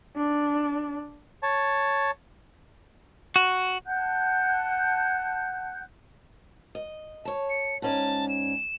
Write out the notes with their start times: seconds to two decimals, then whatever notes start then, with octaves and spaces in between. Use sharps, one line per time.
0.16 D4
1.43 C#5 A5
3.36 F#4
3.86 F#5 A5 F#6 G6
6.75 D#5
7.25 C#5 A5
7.50 C#7
7.82 G#2 C#4 D5 A5
8.29 E7